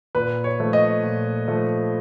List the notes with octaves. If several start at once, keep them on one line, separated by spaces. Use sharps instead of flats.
A#2 B4
C#5
F3 A3
D#5
A#2
F3 A3